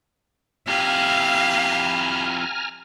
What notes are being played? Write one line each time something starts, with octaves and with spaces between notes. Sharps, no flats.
F2 E4 G4 F5 G#5 A#5 F6